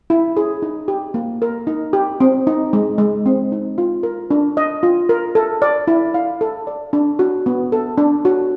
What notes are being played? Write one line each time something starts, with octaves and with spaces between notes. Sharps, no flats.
E4
G#4
D#4
G4
A#3
A#4
D#4
G4
C4
D#4
G#3
G#3
C4
D#4
F4
A#4
D4
D#5
F4
A#4
A4
D5
E4
F5
A4
D5
D4
F#4
B3
A4
D4
F#4